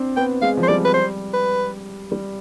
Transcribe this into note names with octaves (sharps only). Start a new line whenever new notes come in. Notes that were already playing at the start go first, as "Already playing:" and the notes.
Already playing: C4 D4
B3 G5
G#3 F5
F3
C5
G3 D5
B4
C5
B4
G3